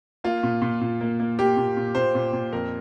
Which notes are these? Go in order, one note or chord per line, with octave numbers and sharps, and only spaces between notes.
A#3 F4
A#2
A#2
A#2
A#3
A#3
A#3 G4
A#2
A#2
A#2 C5
A#2
A#2
F2 A#4